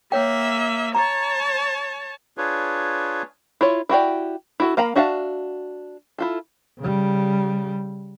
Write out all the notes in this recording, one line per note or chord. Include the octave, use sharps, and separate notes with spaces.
A#3 C#5 E5 G5
C#5 A5 A#5
D4 F4 G#4 B4 C#5
E4 F4 C#5
E4 F#4 G4 D5
E4 F#4 A4
A#3 F5 A#5 B5
D4 F#4 E5 F5 A5
E4 F4 A4
C#3 G3